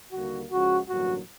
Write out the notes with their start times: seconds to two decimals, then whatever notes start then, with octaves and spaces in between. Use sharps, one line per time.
0.12 D#2 D3 G3 A#3 F#4
0.51 C#2 C#3 F3 G#3 F#4
0.88 A1 G2 D3 F#3 A#3 F#4